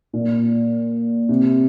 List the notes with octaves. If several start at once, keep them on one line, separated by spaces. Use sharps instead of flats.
A#2
C3